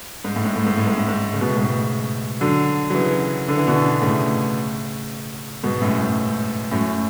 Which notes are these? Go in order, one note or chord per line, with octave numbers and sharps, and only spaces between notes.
G#2
A2
G#2
A2
G#2
A2
G#2
A2
G#2
C#3
B2
A2
G#2 B2
D3 F#3
F#3
C#3 E3
D3
E3
B2 D3
A2 C#3
G#2 B2
F#2 A2
G#2
F#2 A2